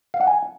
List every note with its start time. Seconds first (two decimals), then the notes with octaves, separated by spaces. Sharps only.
0.14 F5
0.21 F#5
0.27 G#5